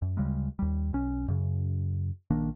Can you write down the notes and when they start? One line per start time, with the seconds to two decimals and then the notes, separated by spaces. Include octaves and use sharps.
0.02 F#2
0.17 D2 C#3 G3 G#3
0.59 D#2 G3
0.93 B1 C#4
1.28 F#2 C#3
2.30 A#1 D#3 A#3 D4